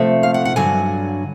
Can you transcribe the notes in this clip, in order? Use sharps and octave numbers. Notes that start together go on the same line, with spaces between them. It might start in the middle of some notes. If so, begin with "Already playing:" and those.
Already playing: C3 F3 A3
F5
F#5
F#5
G2 D3 F#3 G#5